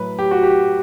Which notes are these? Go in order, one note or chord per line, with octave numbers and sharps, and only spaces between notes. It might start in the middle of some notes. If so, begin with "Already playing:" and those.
Already playing: A2 F#3 B4
G4
F#4
G4